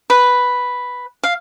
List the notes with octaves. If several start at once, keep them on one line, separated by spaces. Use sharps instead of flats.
B4
F5